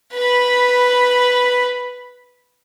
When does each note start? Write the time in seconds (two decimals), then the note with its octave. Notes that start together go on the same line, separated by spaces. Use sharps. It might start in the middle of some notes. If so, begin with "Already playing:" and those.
0.13 B4 B5